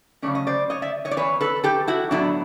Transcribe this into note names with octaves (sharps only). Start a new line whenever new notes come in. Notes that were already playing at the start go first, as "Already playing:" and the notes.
C#3 F#3 A3 C#4 D5
D#5
C5 D5
C#5 D#5
D5 E5
C#5 D#5
D5
E2 C3 E3 B4 C#5
A4 B4
G4 A4
E4 F#4
A2 F#3 B3 D4 E4